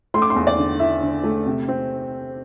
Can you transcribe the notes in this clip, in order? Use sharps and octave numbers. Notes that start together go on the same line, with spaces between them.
A3 C6
D6
C6
E2
D5
D3
E4 E5
D3
A3
C3
C4